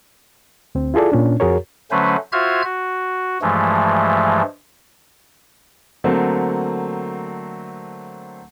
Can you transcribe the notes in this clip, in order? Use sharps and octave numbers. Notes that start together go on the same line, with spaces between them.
D2 C4
E4 F4 G#4 A4 D5
A#2 C#4 D4
F2 F#4 G#4 A#4 C#5
D3 F#3 A3 C#4 B4 C5
F4 F#4 C5 E5 F6 G#6
F#4
G2 E3 F3 G#3 A3
D3 F#3 A3 A#3 C4